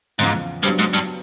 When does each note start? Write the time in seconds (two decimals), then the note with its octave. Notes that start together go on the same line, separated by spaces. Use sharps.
0.19 E2 G#2 C#3 F3
0.63 G2 F#3 B3 D4 G4 C5
0.79 G#2
0.94 G2